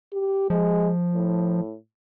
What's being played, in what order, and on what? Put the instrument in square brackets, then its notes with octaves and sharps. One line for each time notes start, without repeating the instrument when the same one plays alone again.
[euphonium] G4
[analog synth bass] F3 [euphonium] G#3
[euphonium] A2